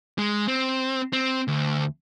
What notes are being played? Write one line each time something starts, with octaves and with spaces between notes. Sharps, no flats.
G#3
C4
C4
D2